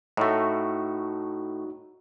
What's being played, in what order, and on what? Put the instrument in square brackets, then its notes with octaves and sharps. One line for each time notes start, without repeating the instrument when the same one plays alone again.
[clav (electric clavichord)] A2 A3 [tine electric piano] D#4 F#4